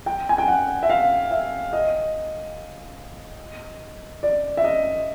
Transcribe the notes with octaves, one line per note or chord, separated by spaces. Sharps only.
G5
G#5
G5
F#5
E5
F5
E5
D#5
D5
E5
D#5